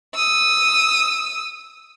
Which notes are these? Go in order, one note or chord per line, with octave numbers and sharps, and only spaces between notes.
D#6 E6